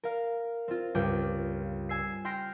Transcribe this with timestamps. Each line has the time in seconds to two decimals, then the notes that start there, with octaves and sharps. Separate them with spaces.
0.04 A#4 F5
0.68 C4 F4
0.95 C#2 G2 G5 D6
1.89 G#5 E6 C7
2.25 G5 C6 F6 A#6 C7 D7